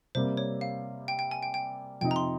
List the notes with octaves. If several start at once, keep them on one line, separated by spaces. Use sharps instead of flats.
C3 G3 A#3 C5
C#5
F5
G5
G5
G#5
G5
G5
F2 C3 F3 C4 D#4 G5
A#5
C6